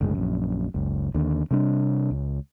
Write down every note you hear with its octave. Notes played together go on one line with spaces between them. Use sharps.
F#1 D2 G#2 G#3
A#1 F#2
F#1 C#2
D#2 D3
C3 G3 D4
C#2